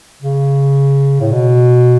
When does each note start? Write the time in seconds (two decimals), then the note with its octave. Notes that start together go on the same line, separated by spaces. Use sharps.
0.22 C#3
1.21 A2
1.33 B2